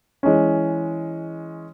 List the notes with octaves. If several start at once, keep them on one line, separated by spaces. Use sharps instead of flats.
E3 G#3 C#4